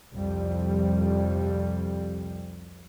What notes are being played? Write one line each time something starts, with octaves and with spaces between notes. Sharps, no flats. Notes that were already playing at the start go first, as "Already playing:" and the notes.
C2 F2 G3